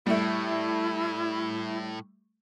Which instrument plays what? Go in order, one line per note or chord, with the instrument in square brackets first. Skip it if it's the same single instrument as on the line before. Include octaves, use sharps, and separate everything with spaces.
[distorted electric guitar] A2 [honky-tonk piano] G3 A3 [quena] E4